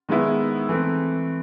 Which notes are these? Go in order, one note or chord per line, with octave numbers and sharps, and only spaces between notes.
D#3 G#3 B3 E4
E3 A3 C4